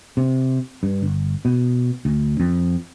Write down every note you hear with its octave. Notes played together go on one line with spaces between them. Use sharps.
C3
G2
G1
B2
D2
F2